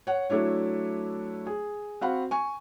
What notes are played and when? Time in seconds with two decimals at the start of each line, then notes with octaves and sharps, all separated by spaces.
0.07 C#5 F#5
0.30 F#3 A3 D4 E4 C#5
1.47 G#4
2.01 C4 F#4 F5 F#5 B5
2.31 G#5 C#6